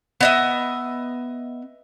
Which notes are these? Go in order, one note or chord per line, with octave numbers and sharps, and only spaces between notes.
B3 D#5 E5